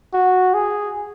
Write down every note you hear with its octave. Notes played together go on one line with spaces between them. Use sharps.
F#4
G#4